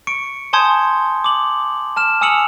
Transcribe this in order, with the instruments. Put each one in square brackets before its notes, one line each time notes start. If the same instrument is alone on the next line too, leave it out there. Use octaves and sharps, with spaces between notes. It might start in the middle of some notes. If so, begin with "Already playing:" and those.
[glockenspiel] C#6 C#7 D7
G#5 A5 C6 D#6 G6 G#6
D6 F#7
A5 F6 E7
G#5 D#6 E6 C#7 F7 F#7